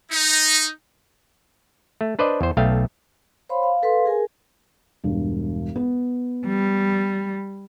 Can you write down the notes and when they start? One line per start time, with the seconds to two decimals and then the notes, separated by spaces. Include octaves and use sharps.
0.11 D#4
2.01 A3
2.19 D4 B4 C5 D5 D#5
2.41 E2 C5
2.57 B1 A3 F5 G5
3.49 C5 C#5 F5 B5 C6
3.63 F5
3.82 A4 B4 F5 C6
4.05 G#4 A#4 G#5
5.04 E1 G2
5.76 B3
6.46 G3